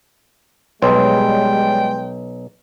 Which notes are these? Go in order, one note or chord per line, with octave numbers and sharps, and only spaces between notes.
B1 G3 G#3 B4 C#5 G5 C6